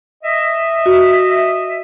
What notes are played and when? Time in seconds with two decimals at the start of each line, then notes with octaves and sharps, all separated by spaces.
0.24 D#5 E5
0.86 F#4